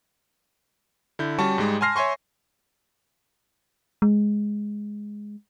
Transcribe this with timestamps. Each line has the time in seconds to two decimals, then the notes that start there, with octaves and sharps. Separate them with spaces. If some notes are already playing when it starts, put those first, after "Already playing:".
1.19 D3 E4 G6
1.39 G3 C#4 F#4 A5 C#6
1.58 G#2 G3 G#3
1.81 G#5 A5 C6 F6 A#6 C7
1.96 C#5 E5 G#5 C6 C#6
4.02 G#3